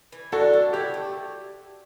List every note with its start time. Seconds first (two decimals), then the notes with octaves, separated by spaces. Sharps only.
0.12 E3
0.32 D4 F#4 A4
0.53 E3
0.73 E4 G4
0.94 A3